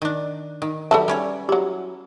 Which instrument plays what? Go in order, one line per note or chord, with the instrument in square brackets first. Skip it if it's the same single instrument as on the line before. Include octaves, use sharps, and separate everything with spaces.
[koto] D#3 D4
D#3
[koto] F#3 G3 [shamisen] A4 B4 A5 [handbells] E5
[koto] G3 C#4 C#5
[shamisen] F#3 E4 [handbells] G4